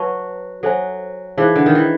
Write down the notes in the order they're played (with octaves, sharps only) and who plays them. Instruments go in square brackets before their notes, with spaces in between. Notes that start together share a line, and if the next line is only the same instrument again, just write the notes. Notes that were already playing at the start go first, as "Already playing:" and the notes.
Already playing: [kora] F#3 [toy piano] B4 E5 A5 C#6
[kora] F#3 [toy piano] A4 C5 E5 G#5
[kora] E3 [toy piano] D#4 G#4 C5 F5
[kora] D3
D#3
E3